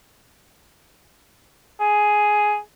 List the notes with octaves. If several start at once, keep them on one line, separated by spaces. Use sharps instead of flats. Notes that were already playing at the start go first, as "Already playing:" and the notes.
G#4